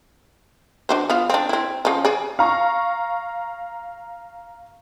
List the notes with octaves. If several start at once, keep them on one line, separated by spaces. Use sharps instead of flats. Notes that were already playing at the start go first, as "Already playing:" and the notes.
D4 F#4 C5
B3 F4 F5
C4 D4
C4 E4
C#3 F3
G#4 D5
F5 A#5 C#6